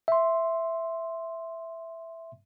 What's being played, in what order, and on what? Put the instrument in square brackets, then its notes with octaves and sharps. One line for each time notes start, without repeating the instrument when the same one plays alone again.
[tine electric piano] E5 C6